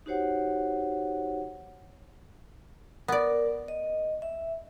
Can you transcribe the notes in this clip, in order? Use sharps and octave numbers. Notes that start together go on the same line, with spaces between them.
D#4 F#4 G4 C5 C#5 F#5
B3 A#4 D5
D#5
E5